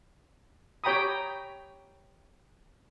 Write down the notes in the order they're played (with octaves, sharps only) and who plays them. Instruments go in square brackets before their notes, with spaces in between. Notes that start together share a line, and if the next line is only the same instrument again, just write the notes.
[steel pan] G4 C#5 G5 A#5 B5 D#6